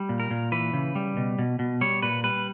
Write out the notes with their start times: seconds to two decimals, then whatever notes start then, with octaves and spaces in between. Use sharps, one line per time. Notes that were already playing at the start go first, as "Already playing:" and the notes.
Already playing: G3
0.09 A#2
0.20 A#4
0.31 A#2
0.52 E3 B4
0.74 C#3
0.95 G3
1.17 B2
1.39 B2
1.59 B2
1.81 G3 C#5
2.02 A#2 B4
2.24 G3 B4